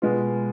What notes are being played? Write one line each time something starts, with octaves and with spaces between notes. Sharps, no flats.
B2 G#3 B3 F4